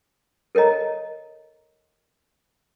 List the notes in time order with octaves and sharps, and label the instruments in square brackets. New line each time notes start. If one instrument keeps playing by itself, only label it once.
[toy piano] A4 A#4 C#5 D#5 A#5